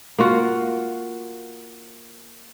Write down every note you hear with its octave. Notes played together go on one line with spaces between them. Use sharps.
A#3 F4 F#4